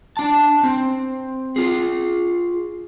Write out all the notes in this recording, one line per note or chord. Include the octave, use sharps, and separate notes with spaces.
D4 A5
C4
F4 G#4